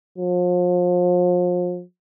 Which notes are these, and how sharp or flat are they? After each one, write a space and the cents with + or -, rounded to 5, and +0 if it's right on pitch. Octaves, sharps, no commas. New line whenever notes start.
F3 +35